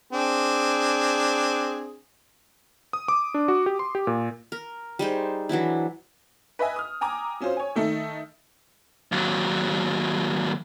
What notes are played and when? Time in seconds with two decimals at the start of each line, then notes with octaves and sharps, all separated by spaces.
0.13 C4 D4 G#4
2.93 D#6
3.08 D6
3.34 D4
3.48 F#4
3.66 G4
3.79 C6
3.95 G4
4.07 A#2
4.52 A#4
4.99 G3 D#4 G#4 C5
5.49 E3 F#3 D4 E4
6.59 B4 D#5 E5 G#5
6.76 D#6 F6
7.01 G5 G#5 A#5 D6 D#6
7.40 F#3 C#4 F4 C5
7.57 C#5 G#5
7.75 D#3 A3 D#4 A4
9.12 D#2 F#3